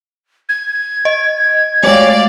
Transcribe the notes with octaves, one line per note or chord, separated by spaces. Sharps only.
G#6
D#5
G#3 A3 C#5 D5 F5